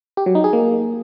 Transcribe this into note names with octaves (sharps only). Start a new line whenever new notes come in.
G4
F#3
D#4
G#4
A#3